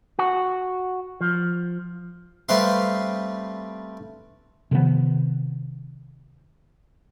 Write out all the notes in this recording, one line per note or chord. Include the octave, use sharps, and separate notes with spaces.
F#4
F3
G3 A3 C4 B4 F5 C6
C3 D#3 F3 B3